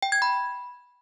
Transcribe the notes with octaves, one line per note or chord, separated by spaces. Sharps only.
G5
G#6
B5